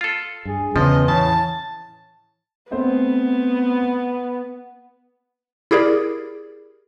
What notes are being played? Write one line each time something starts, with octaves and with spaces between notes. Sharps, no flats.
F4 A4
G2 G#4
E2 C#3 E3 F3 D#5
A2 C#3 E3 A5
A3 B3 C4 C5
E4 G4 G#4 A#4 D5